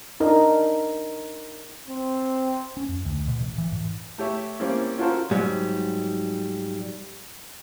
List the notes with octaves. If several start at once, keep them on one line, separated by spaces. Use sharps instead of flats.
D4 D#4 A#4
C4
C#4
F2
D2
B2
A1
E3
G#2
A3 G4 C#5 E5
G3 A#3 C4 C#4 E4
C#4 F4 F#4 A4 A#4 C5
G#2 F#3 G3